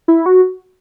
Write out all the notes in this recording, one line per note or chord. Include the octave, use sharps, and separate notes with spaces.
E4
F#4